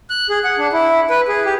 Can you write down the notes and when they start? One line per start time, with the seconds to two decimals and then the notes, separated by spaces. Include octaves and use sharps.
0.10 F#6
0.29 G#4
0.44 F#5
0.58 D4
0.73 E4
1.10 B4
1.28 G#4
1.45 G4